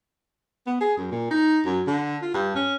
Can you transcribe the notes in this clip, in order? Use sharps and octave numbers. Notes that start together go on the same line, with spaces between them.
B3
G#4
F#2
A#2
D#4
F#2
D3
F4
G2
C#4